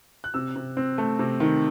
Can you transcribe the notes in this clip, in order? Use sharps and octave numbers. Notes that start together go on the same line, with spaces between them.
F#6
C3 E6
C3
C4
A3
C3
D#3